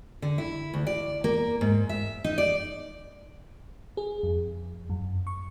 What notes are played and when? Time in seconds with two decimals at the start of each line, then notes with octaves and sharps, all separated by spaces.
0.22 D3
0.38 E4
0.74 D2
0.87 D5
1.24 A#3
1.61 G#2
1.89 E5
2.24 D#4
2.38 D5
3.97 G#4
4.23 F2
4.90 F#2
5.27 C#6